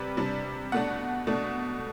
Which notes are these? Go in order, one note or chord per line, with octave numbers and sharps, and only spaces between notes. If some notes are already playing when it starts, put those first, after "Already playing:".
Already playing: C3 G3 B4
C3 G3 D4
B2 A3 D4 F#5
B2 A3 D4